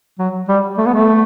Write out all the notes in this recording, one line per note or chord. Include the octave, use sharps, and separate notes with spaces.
F#3
G3
A3
B3
A3